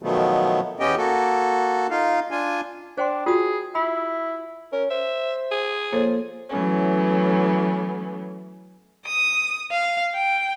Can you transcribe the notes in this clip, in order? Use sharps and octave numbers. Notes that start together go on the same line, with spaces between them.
B2 D#3 F3 F#3 A3 B3
E2 B3 C#4 G4 D#5 G5
A#3 F#4 A4
D#4 F4 F5
D4 F4 G#5
D4 C5 G5 C6
F4 F#4 G#4 D#6
E4 B5
C#4 A#4
C5 E5
G#4
F3 A#3 A4 C#5
E3 F#3 A3 B3 C#4
D#6
F5
G5